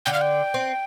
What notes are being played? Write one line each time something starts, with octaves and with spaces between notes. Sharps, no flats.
D3 G5
F5
G5
C4